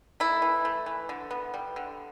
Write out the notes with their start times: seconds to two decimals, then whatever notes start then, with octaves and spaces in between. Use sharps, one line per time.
0.20 A3 E4
0.42 E3
0.65 A3
0.86 E3
1.09 D3
1.31 B3
1.54 G3
1.76 D3